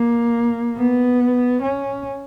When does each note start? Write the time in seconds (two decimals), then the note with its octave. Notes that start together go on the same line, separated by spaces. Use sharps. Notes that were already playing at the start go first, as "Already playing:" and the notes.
Already playing: A#3
0.77 B3
1.62 C#4